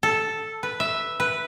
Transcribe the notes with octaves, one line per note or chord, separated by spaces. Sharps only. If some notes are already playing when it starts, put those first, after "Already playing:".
A4
B4
E5
B4